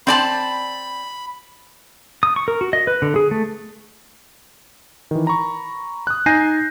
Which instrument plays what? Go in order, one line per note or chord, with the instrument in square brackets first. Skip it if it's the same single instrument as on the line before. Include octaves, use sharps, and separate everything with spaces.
[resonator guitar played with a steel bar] C4 D5 A5 [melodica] B5
[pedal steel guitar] D#6
C#6
A#4
F#4
D#5
B4
D3
G#4
A3
[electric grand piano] D#3 E3
A#5 B5 C#6
D#6 F#6
D#4 G#5 G6 A#6 C7 D#7